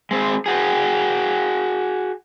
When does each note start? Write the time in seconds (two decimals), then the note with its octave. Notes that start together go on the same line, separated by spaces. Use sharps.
0.11 G#3 C4
0.46 F#4 G#4